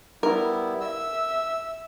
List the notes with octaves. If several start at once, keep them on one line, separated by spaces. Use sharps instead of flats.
G3 B3 E4 A#4
E5 E6